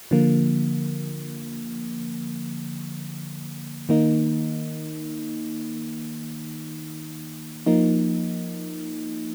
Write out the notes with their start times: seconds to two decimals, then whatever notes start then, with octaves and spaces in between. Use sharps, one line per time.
0.11 D3 F3 A#3
3.89 D#3 A#3 D#4
7.66 F3 A#3 D#4